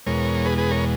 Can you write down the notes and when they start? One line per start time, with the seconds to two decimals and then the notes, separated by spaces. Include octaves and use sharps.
0.06 E2 B2 G#3 A#4 C#5
0.45 G#4 B4
0.58 G#4 B4
0.71 A#4 C#5